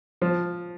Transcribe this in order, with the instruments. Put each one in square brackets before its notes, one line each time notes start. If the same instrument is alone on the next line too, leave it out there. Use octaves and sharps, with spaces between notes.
[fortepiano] F3